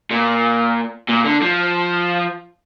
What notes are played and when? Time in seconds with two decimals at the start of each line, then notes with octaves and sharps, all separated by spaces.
0.11 A#2
1.09 A#2
1.25 D3
1.43 F3